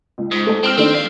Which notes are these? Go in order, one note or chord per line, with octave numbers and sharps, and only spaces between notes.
C#2
G#2
A3 A4
C4 F6 F7 F#7
D#3 A3 C4 D4
F3 F5